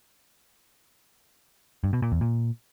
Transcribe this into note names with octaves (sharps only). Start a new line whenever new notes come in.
G2
B2
A#2
E2
A#2